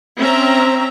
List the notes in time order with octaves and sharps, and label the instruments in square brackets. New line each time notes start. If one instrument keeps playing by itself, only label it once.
[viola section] C4 C#4 E5 A#5